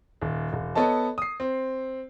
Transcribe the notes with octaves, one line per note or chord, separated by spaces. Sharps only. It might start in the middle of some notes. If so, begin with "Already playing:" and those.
D#1
E1
B3 A4 C#5 D#5 A5
D#6 C7
C4